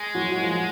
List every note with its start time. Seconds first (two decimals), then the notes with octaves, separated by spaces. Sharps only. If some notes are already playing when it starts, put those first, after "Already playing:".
Already playing: G#3
0.14 F#3 F#4
0.31 F#4
0.42 F3 F4